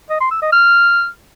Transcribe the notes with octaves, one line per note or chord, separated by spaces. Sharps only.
D#5
C6
E6
D#5
F6